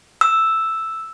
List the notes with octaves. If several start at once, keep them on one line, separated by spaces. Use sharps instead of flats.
E6